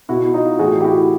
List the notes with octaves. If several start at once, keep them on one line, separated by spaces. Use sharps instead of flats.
B2 E4 F#4
D#4 F4
A2 E3 F#4 G#4
G4
E4 F#4